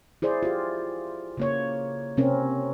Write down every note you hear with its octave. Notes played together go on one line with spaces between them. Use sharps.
E4 G#4 C5 D5
F4 G4
C#3 A#3 C#5
C3 C4 C#4 A#4